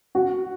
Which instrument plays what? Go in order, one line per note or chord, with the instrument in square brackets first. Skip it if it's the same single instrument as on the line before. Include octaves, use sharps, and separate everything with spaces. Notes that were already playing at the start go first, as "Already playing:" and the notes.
[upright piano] F#4